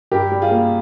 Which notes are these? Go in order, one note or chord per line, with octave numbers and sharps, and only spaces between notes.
G2 G4 A#4
G3
F4 G#4
A#3